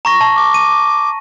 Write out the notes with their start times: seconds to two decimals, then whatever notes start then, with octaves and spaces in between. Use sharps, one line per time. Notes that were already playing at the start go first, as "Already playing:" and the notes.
0.05 A#5 C#6 A#6
0.21 A5
0.36 D6
0.54 D#7